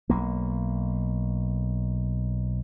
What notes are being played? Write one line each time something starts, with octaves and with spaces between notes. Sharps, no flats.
B1 A#3